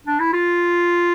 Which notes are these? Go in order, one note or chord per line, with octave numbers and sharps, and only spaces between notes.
D4
E4
F4